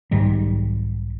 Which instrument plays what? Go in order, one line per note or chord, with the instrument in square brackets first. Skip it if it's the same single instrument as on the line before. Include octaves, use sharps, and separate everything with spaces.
[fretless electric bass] B1 G#2 D#3 G3